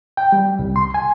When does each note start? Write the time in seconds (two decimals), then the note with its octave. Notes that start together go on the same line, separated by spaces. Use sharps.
0.17 G5
0.32 G3
0.59 C2
0.76 C6
0.94 G#5